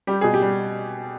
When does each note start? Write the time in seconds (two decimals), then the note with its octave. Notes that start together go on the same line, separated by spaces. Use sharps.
0.07 G3 G4
0.21 B2 G#4
0.34 G4
0.42 G3